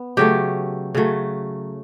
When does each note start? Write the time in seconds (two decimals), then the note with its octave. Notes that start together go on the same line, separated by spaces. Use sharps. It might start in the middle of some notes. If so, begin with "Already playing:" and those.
Already playing: B3
0.17 C#3 F#3 A3 G4
0.95 C#3 F#3 A3